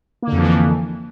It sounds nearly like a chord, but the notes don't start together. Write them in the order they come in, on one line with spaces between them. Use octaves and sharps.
A#3 D3 F2 F3 E3